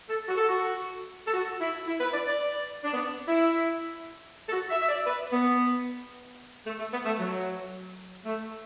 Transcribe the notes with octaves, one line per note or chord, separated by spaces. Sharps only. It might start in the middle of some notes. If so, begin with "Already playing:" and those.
A4
F#4
A4
F#4
A4
F#4
E4
E4
B4
D5
D5
D4
B3
E4
A4
F#4
E5
E5
D5
B4
B3
A3
A3
B3
A3
F#3
A3